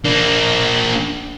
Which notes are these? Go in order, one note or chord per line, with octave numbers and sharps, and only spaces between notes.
A#3 D4